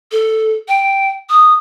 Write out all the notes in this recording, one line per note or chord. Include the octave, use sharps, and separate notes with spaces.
A4
G5
D#6